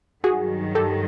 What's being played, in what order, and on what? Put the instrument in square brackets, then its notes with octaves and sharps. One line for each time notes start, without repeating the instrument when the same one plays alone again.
[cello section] G2 D#3 F#3 [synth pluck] F#4 G#4
[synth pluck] G4 A4